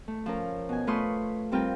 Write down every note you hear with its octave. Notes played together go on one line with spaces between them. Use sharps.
A3
F3 C#4 A#4
B2 G#5
A3 F4 B4 C6 C#6 D#6
G3 C4 F4 A#4 G5